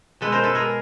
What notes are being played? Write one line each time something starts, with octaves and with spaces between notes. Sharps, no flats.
B2 G#3 A4 B4
A#4 C5
A4 B4
G#4 A#4